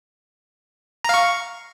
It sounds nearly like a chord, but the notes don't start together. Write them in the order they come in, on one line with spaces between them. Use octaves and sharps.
A#5 F5 C#6